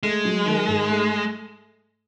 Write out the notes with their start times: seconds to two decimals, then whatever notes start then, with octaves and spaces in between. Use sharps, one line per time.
0.03 G#3 A3
0.25 F#3
0.46 D#3
0.68 G#2
0.90 A3